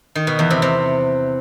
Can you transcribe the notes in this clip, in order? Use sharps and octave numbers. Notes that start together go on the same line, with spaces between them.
D#3
B2
E2
C3
C3